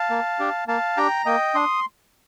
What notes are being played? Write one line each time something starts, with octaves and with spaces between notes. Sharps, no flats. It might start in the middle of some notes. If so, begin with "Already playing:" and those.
Already playing: F5 A5
A#3
D4 G4
A#3 F5 A5
D4 G4 G5 A#5
A#3 D#5 G5
D4 C6 D#6